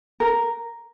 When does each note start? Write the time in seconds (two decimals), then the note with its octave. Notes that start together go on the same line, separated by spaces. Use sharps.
0.20 A#4